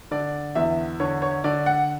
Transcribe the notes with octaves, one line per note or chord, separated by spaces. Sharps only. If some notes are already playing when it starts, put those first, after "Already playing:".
D3 D5
E2 E5
D3 C#5
C#5
D3 D5
F#5